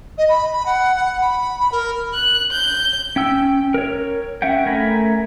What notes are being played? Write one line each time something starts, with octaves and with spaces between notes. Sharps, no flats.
D#5
B5
B5
F#5
F#5
B5
B5
A#4
F#6
G6
C#4 G5 E6
A#4 C#5
C#4 E5 F#5 G5
A3 A#4 G#5 A#5 B5